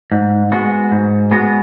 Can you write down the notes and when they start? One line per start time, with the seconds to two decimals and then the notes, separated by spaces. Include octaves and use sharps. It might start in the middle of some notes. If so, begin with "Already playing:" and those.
0.12 G#2
0.52 G#3 B3 F#4
0.91 G#2
1.31 G#3 B3 F#4